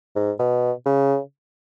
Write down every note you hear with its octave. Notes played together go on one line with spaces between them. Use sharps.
G#2
B2
C#3